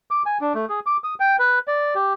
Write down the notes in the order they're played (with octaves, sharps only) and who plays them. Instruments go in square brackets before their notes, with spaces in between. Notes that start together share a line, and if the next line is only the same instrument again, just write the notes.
[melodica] D6
G#5
D4
A3
G#4
D6
D#6
G5
B4
D5
G4